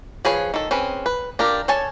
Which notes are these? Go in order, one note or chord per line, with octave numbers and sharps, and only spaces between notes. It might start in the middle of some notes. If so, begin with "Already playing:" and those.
F3 G#4 B4 C#5
D#3 A4
C4 C#4 G#4 B4
B4
D4 F4 G4 A#4
A4 C#5 G#5 A5